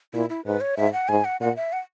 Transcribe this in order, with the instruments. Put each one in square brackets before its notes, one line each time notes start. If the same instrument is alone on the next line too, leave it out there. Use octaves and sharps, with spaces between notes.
[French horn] A#2 [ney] E4
[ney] E4
[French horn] G#2 [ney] B4
[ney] C#5
[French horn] G#2 [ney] E5
[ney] F#5
[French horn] G#2 [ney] G#5
[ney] F#5
[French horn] A#2 [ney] F#5
[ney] E5
F#5